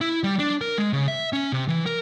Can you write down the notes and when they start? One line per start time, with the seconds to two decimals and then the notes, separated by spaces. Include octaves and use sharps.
0.01 E4
0.24 G3
0.39 D4
0.61 A#4
0.78 G#3
0.93 C#3
1.08 E5
1.33 C#4
1.52 C3
1.68 E3
1.86 A#4